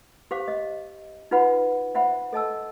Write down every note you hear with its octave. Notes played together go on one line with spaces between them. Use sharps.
G4 C5 F5 D6
D#5
D#4 F4 F#4 B4 F#5 B5
C5 E5 F#5 B5
A4 D#5 A5 E6